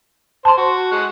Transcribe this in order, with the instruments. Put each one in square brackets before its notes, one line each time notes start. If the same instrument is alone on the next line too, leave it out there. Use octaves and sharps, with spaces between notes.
[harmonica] C5 [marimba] A5 C6
[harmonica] F#4
G#3 F#5